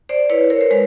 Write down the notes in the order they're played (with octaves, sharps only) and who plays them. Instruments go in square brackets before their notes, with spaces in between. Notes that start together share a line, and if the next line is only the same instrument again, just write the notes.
[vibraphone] C5 D5
E4 B4 C#5
A#4 C5
C5
G#3 B4 C#5